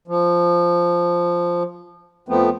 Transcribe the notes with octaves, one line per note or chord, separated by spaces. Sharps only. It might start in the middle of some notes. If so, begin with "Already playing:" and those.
F3
F2 F3 A3 B3 C4